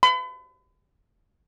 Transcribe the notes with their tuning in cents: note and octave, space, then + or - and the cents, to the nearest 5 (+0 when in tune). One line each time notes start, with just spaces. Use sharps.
B5 +40